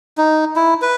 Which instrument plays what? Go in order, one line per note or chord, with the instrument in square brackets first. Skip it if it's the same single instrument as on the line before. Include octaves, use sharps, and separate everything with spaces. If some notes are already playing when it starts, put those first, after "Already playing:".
[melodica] D#4
E4
B4